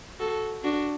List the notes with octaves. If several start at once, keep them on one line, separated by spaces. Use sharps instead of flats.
F#4 A4
D4 F#4